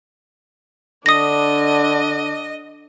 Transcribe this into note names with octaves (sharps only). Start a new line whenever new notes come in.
D3 D4 D#5 D#6 A#6